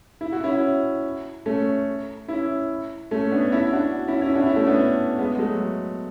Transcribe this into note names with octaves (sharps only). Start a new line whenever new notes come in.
E4
F#4
C#4 E4
A3 C#4
C#4 E4
A3 C#4
B3 D4
C#4 E4
D4 F#4
C#4 E4
C#4 E4
D4 F#4
C#4 E4
A3 C#4
B3 D4
G#3 B3
G#3
F#3 A3